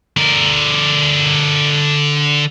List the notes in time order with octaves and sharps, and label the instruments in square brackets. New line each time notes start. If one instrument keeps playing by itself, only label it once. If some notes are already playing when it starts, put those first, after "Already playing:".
[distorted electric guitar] D3 A#4